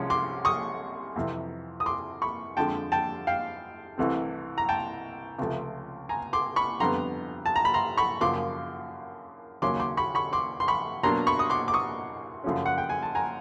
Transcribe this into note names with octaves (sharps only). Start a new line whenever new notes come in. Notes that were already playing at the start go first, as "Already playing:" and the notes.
Already playing: C2 C3 F3 G#3 C#4
C6 D6
C#6 D#6
F2 C3 E3
D#6
C6 D6
B5 C#6
F2 D3 F3 G#3 G5 A5
G5 A5
F5 G5
C2 C3 E3 A3 C4
A#5
G5 A5
C#2 C3 F3 A3
G#5 A#5
C6 D6
B5 C#6
F2 D3 G3 B3 A#5 C6
A5
A#5
B5
A#5 C6
B5 C#6
F#2 C#3 F3 A#3 C6 D6
D#2 C#3 F#3 A#3 C#4 C6 D6
C6 D6
B5 C#6
B5 C#6
C6 D6
C6
B5 C#6
B2 F#3 A#3 D4 A#5 C6
B5 C#6
D#6
C6 D6
D6
C#6 D#6
F#2 C#3 F3 A3 C#4
F#5
G5
G#5
A5
G#5 A#5